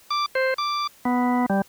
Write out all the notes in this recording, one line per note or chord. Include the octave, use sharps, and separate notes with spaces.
D6
C5
D6
B3
G3